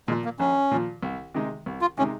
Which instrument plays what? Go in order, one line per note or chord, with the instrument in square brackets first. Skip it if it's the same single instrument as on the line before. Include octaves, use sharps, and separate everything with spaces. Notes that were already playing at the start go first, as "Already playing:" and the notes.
[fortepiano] A#2 F3 [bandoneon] G#3
[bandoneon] A#3
[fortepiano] A#1 [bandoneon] C#4
[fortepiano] A#2 F3
C2
C3 D#3 G#3 D#4
C2
[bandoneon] F4
[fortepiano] C3 D#3 G#3 D#4 [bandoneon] C#4